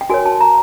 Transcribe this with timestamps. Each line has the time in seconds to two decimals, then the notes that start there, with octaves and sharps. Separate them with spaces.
0.01 G5
0.10 F#4 A#4 C#5 G#5
0.26 A5
0.41 A#5